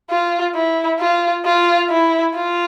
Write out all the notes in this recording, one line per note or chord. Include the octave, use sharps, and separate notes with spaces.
F4
E4
F4
F4
E4
F4